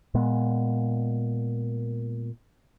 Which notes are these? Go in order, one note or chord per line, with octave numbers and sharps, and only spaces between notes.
A#2 G#3 B3